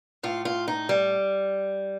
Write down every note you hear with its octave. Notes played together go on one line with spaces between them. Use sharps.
A2 F4
F4
D#4
G3